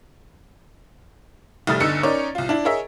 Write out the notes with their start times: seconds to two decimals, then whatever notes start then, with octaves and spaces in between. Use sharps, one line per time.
1.67 F1 G3 A3 D#6 F6 A6
1.80 G1 D3 D#4 E6 C#7
2.03 C#4 D#4 A#4 C#5 D5
2.35 C2 F4
2.49 D4 E4
2.65 G#4 A#4 C#5 D#5 E5